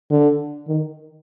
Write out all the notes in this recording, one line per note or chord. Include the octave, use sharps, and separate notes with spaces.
D3
D#3